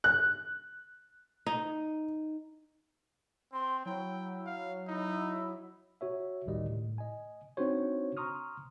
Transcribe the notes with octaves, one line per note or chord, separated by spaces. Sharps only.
F#6
D#4
C4 C6
F#3 E4 G5
F5
D#4 E4
F#4 C#5 E5
A1 D2 A2 D#3 G3 D#5
A2
D#5 G#5
C4 D4 D#4 F#4 C5 C#5
A#5 C6 C#6 D#6 F6